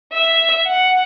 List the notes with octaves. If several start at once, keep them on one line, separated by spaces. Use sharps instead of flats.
E5
F#5